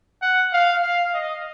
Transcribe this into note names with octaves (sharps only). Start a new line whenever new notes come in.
F#5
F5
F5
D#5